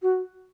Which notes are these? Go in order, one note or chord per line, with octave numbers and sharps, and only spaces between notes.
F#4